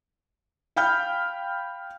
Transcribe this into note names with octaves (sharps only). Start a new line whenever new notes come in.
F5 G5 B5 F6 G6